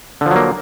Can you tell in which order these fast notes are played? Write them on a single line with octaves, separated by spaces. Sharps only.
D3 F3 F#3 A#3